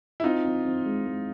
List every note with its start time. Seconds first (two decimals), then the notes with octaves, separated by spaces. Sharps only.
0.20 E4
0.24 C4 D#4 F4
0.44 C4
0.65 C4
0.85 G#3
1.06 G#3